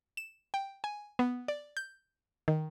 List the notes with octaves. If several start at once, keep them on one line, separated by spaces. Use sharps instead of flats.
E7
G5
G#5
B3
D5
G6
D#3